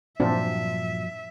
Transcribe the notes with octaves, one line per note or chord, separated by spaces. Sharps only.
G2 A#2 F3 F#3 C4 D4 E5